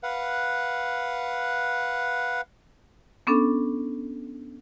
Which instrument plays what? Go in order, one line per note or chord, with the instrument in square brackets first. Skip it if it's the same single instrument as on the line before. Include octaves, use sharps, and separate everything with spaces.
[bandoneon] B4 F5 F#5
[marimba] B3 C#4 D4 A4